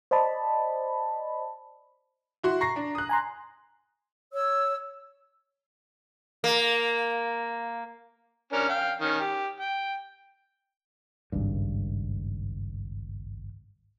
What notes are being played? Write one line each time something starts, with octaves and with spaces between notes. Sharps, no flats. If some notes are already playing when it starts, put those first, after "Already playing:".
C5 D5 D#5 A5 B5
E4 F#4 C6
A#5 C#6 A#6 C7
D4
D#6 F#6
G#5 A#5 C6
C#5 E6
A#3
C#4 D4 A#4
F5 G5
D#3 C#4
G4
G5
G#1 C#2 G2